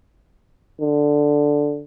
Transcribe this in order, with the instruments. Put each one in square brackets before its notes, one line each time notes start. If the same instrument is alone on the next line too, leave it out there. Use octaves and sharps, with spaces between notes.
[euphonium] D3